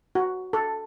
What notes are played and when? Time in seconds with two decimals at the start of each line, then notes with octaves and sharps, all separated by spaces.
0.15 F#4
0.53 A4